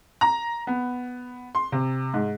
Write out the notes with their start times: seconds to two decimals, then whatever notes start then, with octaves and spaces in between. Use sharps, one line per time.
0.21 A#5
0.67 B3
1.55 C6
1.72 C3
2.14 G#2